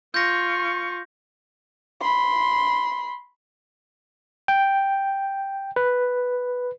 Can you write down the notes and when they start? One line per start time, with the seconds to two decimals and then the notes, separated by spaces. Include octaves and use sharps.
0.14 F4 C#6 G6 A#6
2.01 B5 C6
4.48 G5
5.76 B4